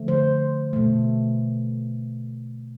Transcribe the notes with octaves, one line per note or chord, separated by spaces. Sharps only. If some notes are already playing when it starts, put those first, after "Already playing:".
Already playing: D3 F3 A3
C5
B2 A3